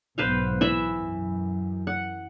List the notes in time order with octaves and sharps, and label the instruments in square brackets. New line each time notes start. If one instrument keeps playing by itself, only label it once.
[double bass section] B1 G#2 B3 [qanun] B4 C5 F5
[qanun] E3 E5 B5
[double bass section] F#2
[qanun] F#5